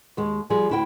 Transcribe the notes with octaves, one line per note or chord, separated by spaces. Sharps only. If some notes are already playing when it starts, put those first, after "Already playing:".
D#2 G#3
F3 G3 G#4
D2 E4 G5